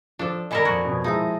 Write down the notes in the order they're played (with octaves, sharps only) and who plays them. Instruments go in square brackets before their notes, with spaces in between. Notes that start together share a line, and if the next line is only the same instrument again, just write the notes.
[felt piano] F3 [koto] D4 A4
[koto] A#2 A4 A#4 [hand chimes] D5 G#5 B5 [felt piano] D#5
[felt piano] F2 G#6 [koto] F#4
[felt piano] F2 B2
[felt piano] F3 G#3 E4 [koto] D#4 [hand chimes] E5 A5